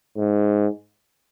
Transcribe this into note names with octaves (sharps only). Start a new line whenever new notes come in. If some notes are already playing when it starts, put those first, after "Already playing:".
G#2